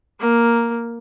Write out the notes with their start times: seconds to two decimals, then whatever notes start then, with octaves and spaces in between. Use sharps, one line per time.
0.20 A#3